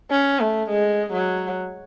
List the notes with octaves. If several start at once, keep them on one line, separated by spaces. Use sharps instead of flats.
C#4
A3
G#3
F#3